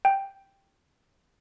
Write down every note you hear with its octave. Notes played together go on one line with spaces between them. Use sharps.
G5